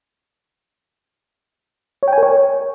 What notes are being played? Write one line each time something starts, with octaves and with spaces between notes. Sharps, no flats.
C#5
G5
G#5
A#4
C#5